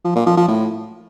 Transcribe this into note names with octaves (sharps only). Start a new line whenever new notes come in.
F3
A#2
F3
F3
A2